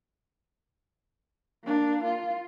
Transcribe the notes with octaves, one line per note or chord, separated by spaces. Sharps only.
A#3 D4
F4